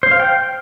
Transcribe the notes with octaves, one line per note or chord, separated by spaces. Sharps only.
C5
F5
G5